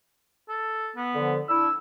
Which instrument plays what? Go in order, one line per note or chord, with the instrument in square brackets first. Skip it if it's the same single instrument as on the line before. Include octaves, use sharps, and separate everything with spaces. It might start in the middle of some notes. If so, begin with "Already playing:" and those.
[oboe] A4
B3
[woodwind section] D3 F3
[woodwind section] D4 E4 [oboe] E6